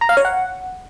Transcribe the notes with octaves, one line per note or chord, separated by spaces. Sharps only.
A#5
F5
C#5
F#5